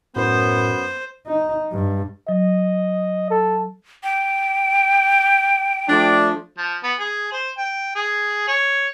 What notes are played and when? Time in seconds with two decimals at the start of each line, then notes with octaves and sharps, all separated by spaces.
0.16 F#2 A2 B3 C5
1.27 D#4
1.72 G2
2.29 F#3 D#5
3.31 A4
4.04 G5
5.89 F3 A3 D4
6.58 F3
6.83 B3
6.99 G#4
7.32 C5
7.58 G5
7.96 G#4
8.48 C#5